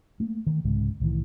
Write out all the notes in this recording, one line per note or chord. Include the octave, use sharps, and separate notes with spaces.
A3 A#3
D#3
C2 G#2 C#3 G#3
C2 A2 D#3 E3